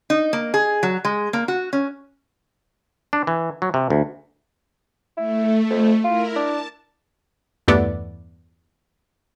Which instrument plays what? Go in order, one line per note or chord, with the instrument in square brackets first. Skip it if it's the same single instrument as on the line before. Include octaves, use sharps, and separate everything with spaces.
[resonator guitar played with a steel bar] D#4
A#3
G#4
F#3
G#3
A#3
F#4
C#4
[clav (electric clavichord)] D4
E3
F#3
C3
D2
[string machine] A3 [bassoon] E4
[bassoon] F2
[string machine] E4 A#4 [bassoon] F4
[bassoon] D4 [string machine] A5
[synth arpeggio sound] E2 G2 A3 B3 D5